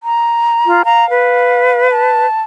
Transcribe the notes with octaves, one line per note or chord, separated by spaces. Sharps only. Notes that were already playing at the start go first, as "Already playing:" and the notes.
A#5
F4
F5 A#5
B4
A5